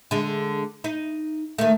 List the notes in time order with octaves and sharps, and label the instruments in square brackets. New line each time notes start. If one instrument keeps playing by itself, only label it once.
[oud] D3 G#3
D#4
D#3 A3